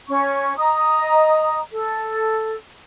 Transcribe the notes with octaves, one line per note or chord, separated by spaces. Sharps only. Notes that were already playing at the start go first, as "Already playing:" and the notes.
C#4 C#6
D#5 A#5 D#6
A4